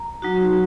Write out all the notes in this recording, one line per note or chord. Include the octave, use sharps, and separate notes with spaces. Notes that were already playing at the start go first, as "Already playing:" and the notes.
Already playing: A#5
F#3 D#4 F#4